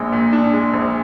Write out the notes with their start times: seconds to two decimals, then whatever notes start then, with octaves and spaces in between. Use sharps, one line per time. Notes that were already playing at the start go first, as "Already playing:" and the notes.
Already playing: A#1 G#3
0.12 A#2
0.33 D4
0.53 G#3
0.74 A#1